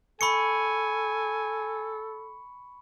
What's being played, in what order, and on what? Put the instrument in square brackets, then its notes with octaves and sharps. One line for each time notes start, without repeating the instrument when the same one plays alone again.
[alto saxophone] A4 [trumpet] G#5 [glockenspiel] B5 C#6 C#7